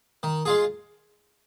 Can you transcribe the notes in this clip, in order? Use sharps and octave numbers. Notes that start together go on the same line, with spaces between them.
D#3
G#3 F4 G#4